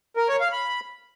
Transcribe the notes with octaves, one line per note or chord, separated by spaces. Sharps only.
A#4
C#5
F5
B5